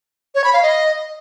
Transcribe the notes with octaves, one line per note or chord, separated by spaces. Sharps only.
C#5
B5
F5
D#5